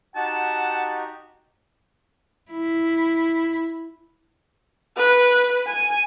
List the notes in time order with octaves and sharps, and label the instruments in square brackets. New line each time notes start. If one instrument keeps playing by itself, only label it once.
[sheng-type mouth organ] D#4 F#4 G4 [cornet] F#5 [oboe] A5
[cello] E4
[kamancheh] B4
G#5